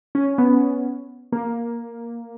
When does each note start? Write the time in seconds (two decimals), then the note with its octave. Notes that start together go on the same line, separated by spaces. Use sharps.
0.15 C#4
0.38 B3
1.32 A#3